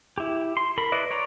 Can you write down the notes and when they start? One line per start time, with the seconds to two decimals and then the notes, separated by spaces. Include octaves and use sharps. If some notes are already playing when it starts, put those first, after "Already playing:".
0.18 E4 G4
0.57 C6
0.78 A#4 B5
0.92 E4 B4 D5 D#5
1.11 C#5 D5 A#5